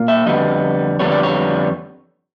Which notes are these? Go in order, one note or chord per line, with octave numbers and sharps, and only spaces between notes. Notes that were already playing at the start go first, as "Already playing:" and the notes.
Already playing: A#2 A#3
E5
F2 D3 G3 B3 D#5
F2 D3 G3 B3 C#5
D5
C#5